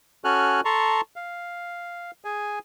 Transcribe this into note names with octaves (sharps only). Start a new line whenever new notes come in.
C#4 F#4 A4 G#5 F6 F#6
A4 A5 A#5 C6 C#6
F5
G#4 G#5